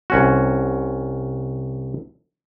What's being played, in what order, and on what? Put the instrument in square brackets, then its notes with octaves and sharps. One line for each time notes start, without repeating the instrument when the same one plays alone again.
[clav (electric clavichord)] C2 C#4 F#4